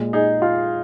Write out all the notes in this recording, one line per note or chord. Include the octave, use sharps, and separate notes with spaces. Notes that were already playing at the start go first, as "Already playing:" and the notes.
Already playing: A#2 G#3
D#4 G#4
F4